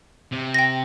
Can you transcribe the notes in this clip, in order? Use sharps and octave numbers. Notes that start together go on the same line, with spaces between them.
C3
G5 A#6